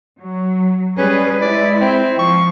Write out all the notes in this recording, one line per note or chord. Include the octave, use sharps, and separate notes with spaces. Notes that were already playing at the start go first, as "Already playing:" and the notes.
F#3
G3 C#4 G#4 B4
G#3 E4 D5
C4
F3 C#6